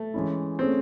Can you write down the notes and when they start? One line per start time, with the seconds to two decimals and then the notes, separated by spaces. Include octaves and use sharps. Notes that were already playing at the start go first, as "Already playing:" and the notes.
Already playing: A3
0.14 E3 G#3 C#4 E4
0.59 A3 C4 C#4 G#4